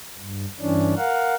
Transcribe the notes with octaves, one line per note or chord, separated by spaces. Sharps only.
G2
G2 E3 C#4 D4
A#4 F5 F#5